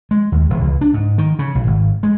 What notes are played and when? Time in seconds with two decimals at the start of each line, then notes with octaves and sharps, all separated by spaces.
0.11 G#3
0.32 D#2
0.50 E1
0.64 C#2
0.81 D4
0.94 G#2
1.18 D#3
1.39 C#3
1.55 B1
1.67 G#1
2.03 G#3